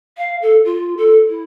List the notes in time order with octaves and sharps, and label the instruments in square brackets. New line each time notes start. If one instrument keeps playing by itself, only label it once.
[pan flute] F5
A4
F4
A4
E4